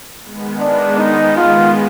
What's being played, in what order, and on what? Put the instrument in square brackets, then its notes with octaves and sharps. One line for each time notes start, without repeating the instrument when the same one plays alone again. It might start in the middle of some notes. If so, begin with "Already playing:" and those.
[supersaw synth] D#3 G#3 B3
[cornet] D4
D#4
F4